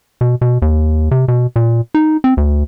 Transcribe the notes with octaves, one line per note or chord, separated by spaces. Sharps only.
B2
B2
D#2
C3
B2
A#2
D#4
C4
D2